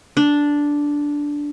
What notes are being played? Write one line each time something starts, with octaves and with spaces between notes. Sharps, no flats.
D4